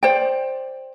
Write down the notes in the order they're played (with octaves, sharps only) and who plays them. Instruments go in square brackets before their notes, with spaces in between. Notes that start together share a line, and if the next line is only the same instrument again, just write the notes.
[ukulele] C5 D5 G5